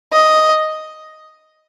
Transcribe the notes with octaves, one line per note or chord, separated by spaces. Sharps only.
D#5